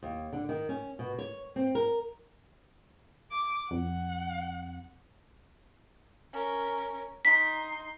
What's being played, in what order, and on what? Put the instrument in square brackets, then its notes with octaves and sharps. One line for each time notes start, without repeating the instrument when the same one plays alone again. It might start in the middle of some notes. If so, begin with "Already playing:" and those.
[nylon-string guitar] D#2
D3
D#3
C#4
B2
C#5
C4
A#4
[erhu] D6
[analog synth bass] F2 [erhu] F#5
[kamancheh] C#4 A#4
[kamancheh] D#4 C6 [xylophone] B6